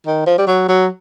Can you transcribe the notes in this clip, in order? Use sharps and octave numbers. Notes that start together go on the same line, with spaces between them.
D#3
F3
G3
F#3
F#3